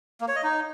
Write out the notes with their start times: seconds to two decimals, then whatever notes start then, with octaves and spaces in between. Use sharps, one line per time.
0.21 A#3
0.28 C#5
0.36 D#5
0.43 D#4